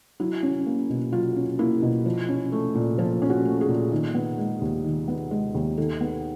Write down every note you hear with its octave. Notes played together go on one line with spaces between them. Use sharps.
F#3 E4
C#4
A#3
B2
F#3 F4
C#4
A#3 E4
B2
F3
C#4
A3
A#2
F3 F4
C#4
F#4
A3
G#4
A#2
D#3
B3
G#3
D#2
D#3
B3
G#3
D#2
D#3 A4
B3